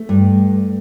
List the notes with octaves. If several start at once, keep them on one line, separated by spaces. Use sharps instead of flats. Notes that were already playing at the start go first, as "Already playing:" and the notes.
Already playing: A3
G2